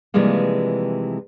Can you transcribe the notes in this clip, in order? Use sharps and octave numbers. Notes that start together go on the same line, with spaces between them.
C3 E3 F3 G3 G#3 A#3